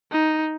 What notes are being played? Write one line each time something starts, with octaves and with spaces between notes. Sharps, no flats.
D#4